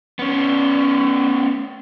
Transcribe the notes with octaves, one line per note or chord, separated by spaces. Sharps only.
B3 C#4